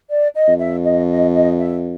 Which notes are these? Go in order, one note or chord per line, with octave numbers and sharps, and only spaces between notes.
D5
D#5
F2
E5
D#5
D#5
D#5
E5